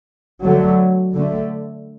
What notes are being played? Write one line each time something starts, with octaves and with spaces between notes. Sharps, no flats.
D3 F#3 A3
D3 A3